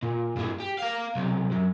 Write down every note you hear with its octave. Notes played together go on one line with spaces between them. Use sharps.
A#2
G2 A#3
G4
A#3 F5
B1 C3
F#2